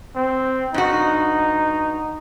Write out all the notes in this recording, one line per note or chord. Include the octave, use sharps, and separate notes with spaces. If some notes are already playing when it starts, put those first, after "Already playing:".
C4
G2 D#4 F#4